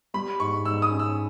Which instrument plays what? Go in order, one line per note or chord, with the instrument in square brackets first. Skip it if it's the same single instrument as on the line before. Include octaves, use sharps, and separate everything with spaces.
[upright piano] G3 [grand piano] B5
[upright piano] G#2 [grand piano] C#6
[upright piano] G#2 [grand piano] E6
[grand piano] D#6
[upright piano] C#4
[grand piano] E6